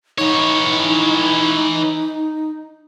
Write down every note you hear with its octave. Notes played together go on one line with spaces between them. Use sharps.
E3 D#4 C#5